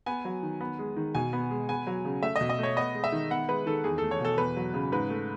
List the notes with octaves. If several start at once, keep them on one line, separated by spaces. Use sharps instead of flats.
B3 G#5
F#3
D#3
B3
G#3
D#3
B2 G#5
B3
G#3
B3 G#5
F#3
C#3
A3 E5
D#5
B2
D#5
A3 C#5
B3 D#5
G#3
E5
D#3
B3 F#5
G#3 B4
D#3 A4
E2 G#4
A4
A3
C#5
B2 A4
E2 B4
F#3
C#3
G#2 B4
A3